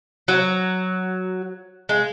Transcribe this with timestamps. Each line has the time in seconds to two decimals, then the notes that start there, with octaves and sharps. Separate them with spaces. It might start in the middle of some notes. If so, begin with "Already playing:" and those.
0.28 F#3
1.89 G#3